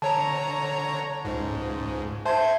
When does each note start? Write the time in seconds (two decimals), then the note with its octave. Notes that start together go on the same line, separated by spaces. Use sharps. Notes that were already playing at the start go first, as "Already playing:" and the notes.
0.02 D3 C#5 A5 A#5
1.25 C#2 G#2
2.26 C5 E5 A5 C6 G6 G#6